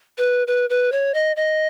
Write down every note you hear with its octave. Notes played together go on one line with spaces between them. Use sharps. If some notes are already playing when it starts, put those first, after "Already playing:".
B4
B4
B4
C#5
D#5
D#5